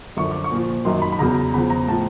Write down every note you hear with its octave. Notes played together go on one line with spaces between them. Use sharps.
F#2 D3 F3 C#6
D6
C#6
A#2 F3
F#2 D#3 F#3 C6
B5
B5
E2 C#3 F#3 A#5
E2 C#3 F3 B5
A#5
A2 F3 A5